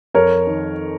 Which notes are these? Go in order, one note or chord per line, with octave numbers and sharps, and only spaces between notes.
F2 A#4 C#5
D#3